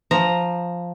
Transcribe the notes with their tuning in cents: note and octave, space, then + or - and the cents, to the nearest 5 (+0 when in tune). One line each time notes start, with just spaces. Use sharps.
F3 +0 A#5 +0